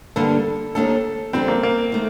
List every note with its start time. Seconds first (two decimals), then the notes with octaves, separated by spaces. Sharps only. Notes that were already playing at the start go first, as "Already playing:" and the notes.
0.16 G2 D3 G3 A#3 D4 A4
0.75 D#2 D#3 A#3 D4 G4 A4
1.33 F2 D3 G3 C4 D4 G4
1.48 A#3
1.63 A#3
1.92 D#3 A3